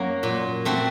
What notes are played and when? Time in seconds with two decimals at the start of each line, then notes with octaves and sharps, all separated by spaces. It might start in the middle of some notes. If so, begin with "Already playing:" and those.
Already playing: F#2 F#3 A#3 F#4
0.23 A#2
0.65 A3 C4 F#4